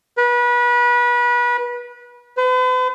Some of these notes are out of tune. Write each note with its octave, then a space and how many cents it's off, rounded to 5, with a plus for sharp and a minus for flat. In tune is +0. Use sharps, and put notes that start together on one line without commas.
B4 -30
B4 +45